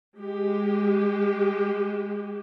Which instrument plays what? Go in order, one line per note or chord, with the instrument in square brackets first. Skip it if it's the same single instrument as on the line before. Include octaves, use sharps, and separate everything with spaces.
[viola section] G#3 G4